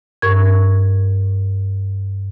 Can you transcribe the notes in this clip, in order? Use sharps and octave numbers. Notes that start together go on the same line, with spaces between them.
G2 A#4 C#6 G#6